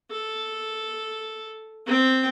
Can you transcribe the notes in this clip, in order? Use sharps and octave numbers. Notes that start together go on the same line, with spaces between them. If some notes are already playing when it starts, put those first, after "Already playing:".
A4
C4 G5